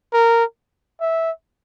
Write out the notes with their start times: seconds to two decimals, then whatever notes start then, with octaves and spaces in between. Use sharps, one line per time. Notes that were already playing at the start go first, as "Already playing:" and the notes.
0.13 A#4
1.01 E5